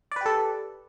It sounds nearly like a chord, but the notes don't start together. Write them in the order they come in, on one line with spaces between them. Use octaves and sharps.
D5 B4 G4 A4